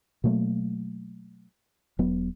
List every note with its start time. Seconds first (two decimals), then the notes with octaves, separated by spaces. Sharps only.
0.24 B2 F#3 A3 A#3
1.99 E1 F#3 B3